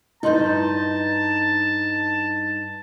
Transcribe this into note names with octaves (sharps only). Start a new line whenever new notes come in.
G2 D#4 E4 A5 C6 G6